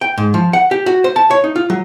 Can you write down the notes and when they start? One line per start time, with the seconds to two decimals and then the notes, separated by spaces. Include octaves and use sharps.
0.01 G5
0.18 G#2
0.34 F3
0.53 F#5
0.71 G4
0.86 F#4
1.04 C5
1.16 A5
1.31 C#5
1.44 D#4
1.56 F4
1.70 F#3